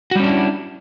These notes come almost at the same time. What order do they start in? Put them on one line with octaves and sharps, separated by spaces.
F#4 G3 C#4 D4 E4